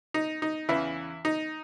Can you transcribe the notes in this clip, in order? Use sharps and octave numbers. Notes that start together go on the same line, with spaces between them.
D#4
D#4
E2 C#3 E3 E4
D#4